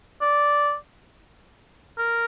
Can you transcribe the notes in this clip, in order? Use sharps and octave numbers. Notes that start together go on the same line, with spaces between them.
D5
A#4